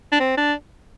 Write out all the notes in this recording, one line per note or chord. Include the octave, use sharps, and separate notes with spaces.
D4
C4
D4